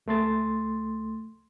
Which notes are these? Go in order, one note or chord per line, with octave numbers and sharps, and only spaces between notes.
C#2 A3 C6 A6